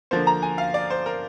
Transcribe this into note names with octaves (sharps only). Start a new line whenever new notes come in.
D3 F3 A#3 C5
A#5
G#5
F5
D5
C5
A#4